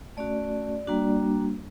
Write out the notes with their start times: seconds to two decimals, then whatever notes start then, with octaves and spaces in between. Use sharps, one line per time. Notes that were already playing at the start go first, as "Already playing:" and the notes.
0.17 A3 C#4 F#4 D5
0.87 G3 A#3 D4 F#4